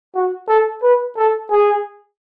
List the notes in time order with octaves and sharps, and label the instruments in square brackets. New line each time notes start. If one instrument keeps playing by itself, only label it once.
[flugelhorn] F#4
A4
B4
A4
G#4